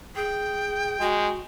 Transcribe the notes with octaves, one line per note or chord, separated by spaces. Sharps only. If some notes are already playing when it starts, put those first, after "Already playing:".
G#4 G5
G#3 F#4